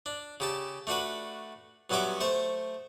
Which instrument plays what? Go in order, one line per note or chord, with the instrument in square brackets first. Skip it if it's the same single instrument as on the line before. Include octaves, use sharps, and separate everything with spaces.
[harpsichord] D4
C#3 G4 A5
A3 D4 F#4 B4
G2 F#3 B3 C#4 E5 D6
A3 C5 C#6